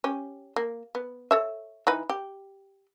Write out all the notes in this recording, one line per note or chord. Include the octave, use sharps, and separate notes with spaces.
C#4 G4
A#3
B3
A4 C#5 E5
E3 D#4 B4
G4